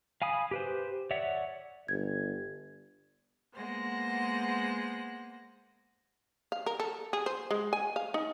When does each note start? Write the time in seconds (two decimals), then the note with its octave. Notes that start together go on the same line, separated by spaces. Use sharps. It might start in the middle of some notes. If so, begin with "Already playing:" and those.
0.22 F5 G#5 B5 D#6
0.51 G4 B4 C5
1.11 C#5 D5 E5 F#5
1.88 G1 G#6
3.55 G#3 A#3 B3 C5 F#5 A#6
6.52 F5
6.66 A#4
6.80 A4
7.13 G#4
7.26 C5
7.51 G#3
7.73 G#5
7.96 F5
8.14 D#4